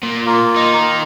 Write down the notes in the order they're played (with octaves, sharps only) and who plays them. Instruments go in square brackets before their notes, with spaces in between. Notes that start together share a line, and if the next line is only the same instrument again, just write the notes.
[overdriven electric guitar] A#2
[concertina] A#3 F4
[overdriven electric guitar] D#3 D#4